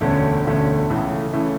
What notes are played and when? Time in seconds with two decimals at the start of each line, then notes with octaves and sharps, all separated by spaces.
0.01 E1 D2 D3 A3 C#4
0.44 E1 D2 D3 A3 C#4
0.90 C#2 C#3 E3 A3
1.33 C#3 E3 A3